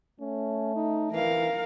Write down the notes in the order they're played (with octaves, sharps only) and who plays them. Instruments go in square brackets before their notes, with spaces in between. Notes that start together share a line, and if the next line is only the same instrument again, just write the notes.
[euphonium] A3 [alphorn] C#4
[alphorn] D#4
[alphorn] E3 [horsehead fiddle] A#4 F5